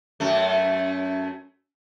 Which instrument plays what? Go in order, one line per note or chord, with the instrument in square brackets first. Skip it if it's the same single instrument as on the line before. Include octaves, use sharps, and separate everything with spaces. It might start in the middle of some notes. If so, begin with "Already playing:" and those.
[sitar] F#2 A3